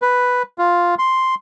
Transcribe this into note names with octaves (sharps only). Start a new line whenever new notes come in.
B4
F4
C6